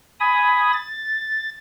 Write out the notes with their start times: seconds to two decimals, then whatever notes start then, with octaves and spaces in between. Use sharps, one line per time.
0.20 G#5 B5 D#6
0.73 A6